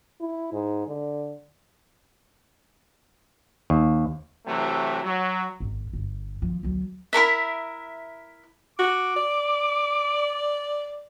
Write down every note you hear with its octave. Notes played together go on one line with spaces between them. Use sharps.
E4
G#2
D3
D#2
C3 E3 F#3 A3
F#3
G#1
G1
F3
D2 F#3
E4 A4 A#4 E5
F#4 D6
D5